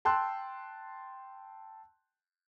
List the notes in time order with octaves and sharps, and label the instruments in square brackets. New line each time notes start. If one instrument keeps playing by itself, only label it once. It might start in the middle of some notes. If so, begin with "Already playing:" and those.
[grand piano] G5 A5 C6 E6 F#6